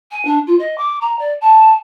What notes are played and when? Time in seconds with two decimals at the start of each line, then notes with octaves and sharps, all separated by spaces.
0.11 G#5
0.24 D4
0.46 F4
0.58 D#5
0.77 D6
1.01 A#5
1.18 D5
1.40 A5